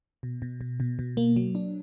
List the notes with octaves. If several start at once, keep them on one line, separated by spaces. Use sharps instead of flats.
B2
B2
B2
B2
B2
A#3
F#3
D4